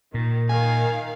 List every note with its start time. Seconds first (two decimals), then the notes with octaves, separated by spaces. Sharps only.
0.14 A#2 D#3
0.50 D#3 F5 G#5